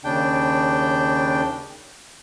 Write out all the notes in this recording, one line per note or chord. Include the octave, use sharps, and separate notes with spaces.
D#2 C#3 D4 G5